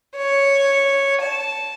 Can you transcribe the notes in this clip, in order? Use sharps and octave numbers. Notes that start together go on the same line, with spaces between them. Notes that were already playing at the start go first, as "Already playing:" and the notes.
C#5
A5